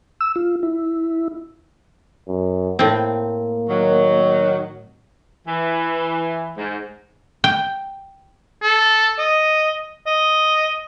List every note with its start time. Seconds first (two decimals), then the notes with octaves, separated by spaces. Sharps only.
0.21 E6
0.36 F4
0.63 E4
2.28 F#2
2.79 A2 A#3 C4
3.69 D#3 F#3
5.46 E3
6.57 G#2
7.44 G5
8.62 A4
9.18 D#5
10.07 D#5